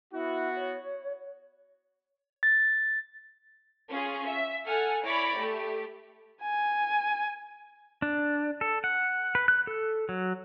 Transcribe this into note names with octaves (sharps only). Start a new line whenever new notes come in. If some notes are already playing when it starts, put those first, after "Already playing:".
B3 E4 F#4
C#5
A6
C#4 F4 G#4
E5
A4 F#5 G#5 F6
E4 C#5 D5 B5 A#6 D7
A3 G4
G#5
D4
A4
F#5
B4
F#6
A4
F#3